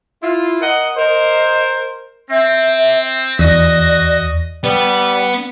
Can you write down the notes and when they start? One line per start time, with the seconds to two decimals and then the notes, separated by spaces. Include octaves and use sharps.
0.23 E4 F4
0.61 A#4 D#5 F#5
0.97 A#4 C5 D#5
2.30 C4 E5
3.39 E2 F#4 D5 D#5
4.64 G3 B3